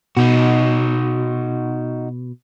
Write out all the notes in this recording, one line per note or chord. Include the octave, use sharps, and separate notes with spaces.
B2 D#4 F#4